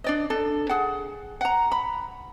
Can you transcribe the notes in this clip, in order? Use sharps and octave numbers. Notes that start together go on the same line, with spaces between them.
D4 D5 D#5
D4 A4
G#4 F#5
F#5 A#5
B5